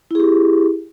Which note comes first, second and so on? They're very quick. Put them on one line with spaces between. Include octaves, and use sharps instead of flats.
E4 G#4 G4